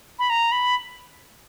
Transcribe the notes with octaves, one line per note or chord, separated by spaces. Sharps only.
B5
A#5
B5